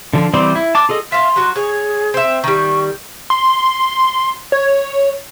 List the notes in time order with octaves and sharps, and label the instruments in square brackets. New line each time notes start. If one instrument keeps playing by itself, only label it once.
[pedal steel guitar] D3 F3
E3 G3 C4 C5 D5
E4
A5 D6
F4 G#4 A4 D#5
[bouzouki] E5 F5 [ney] C6
[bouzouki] F#3 F#4
[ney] G#4 [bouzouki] C#5
[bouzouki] C4 E5
[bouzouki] D#3 G3 [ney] C#6
[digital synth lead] C6
C#5